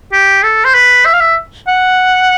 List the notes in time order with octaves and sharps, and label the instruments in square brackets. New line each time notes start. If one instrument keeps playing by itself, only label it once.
[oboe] G4
A4
C5
B4
E5
F5
E5
F#5